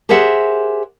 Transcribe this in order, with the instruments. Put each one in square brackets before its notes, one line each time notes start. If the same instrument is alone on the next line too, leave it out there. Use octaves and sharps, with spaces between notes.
[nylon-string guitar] G4 G#4 A#4 C5 E5 F#5